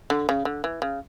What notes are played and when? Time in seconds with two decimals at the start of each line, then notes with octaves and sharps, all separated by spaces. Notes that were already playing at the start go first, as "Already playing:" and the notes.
0.10 D3
0.29 C#3
0.45 D3
0.64 E3
0.82 C#3